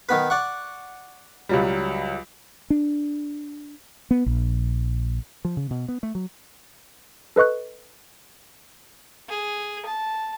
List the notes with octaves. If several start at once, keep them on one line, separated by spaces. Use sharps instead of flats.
D#3 B3 B4
D5 F#5 C#6
C#2 F#3 G3
D4
B3
A#1
F3
C#3
B2
B3
A3
F#3
A4 B4 D#5 C#6 F#6
G#4
A5